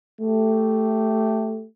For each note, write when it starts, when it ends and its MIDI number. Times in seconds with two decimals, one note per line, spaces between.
0.20 1.64 57
0.20 1.64 67